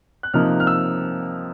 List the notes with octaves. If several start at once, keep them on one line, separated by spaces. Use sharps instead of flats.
F#6
C3 F3 A#3 D#4 F6
F6
E6